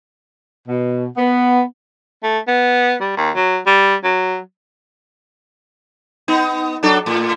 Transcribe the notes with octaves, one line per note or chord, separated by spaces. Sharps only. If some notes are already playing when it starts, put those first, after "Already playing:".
B2
B3
A3
B3
G3
D#2
F#3
G3
F#3
B3 D#4
F#3 D4 A4
A2